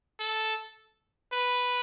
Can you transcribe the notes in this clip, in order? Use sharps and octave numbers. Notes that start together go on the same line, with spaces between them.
A4
B4